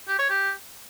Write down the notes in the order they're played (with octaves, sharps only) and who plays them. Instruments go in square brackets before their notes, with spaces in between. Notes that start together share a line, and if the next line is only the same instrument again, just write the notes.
[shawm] G4
C#5
G4